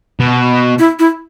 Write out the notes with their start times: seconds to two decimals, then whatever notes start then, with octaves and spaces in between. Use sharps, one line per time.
0.20 B2
0.79 E4
0.99 E4